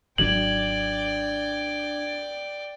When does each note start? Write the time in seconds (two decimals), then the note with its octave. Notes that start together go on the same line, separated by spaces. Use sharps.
0.18 G#1 D#3 F#3 D4 D5 G5 G#6 F#7